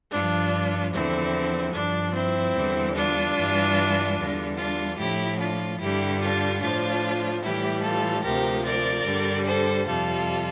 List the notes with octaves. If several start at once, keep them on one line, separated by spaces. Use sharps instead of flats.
G2 F3 D4 F4
E2 D3 F3 C4 E4
G2 F3 D4
C4 E4
E2 D3 G3
D4 F4
G2 E3 G3
E2 D3 G3
D4 F4
A2 F3 E4 G4
D4 F4
G2 D3 G3 E4 G4
D4 F4
A2 F3 D4 F4
A2 E3 G3 E4 G4
F4 A4
D2 C3 F3 G4 A#4
A#4 D5
G2 D3 G3
A4 C5
F2 C3 G3 F4 A4